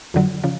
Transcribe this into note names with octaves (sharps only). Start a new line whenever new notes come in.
F2 D3 F#3
C#3 F3